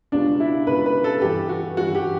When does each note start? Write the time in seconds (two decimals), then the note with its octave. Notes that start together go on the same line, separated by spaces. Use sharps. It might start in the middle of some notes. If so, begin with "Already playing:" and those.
0.12 C#2 B2 G3 D4
0.40 E4
0.67 C#2 B2 G3 B4
0.86 B4
1.04 A4
1.22 G2 E3 G3 G4
1.49 F#4
1.77 G2 E3 G3 F#4
1.95 G4